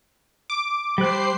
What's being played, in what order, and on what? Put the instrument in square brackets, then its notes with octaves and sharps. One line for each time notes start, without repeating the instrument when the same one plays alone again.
[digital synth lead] D6
[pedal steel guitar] G3 F#6 [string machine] C5 C7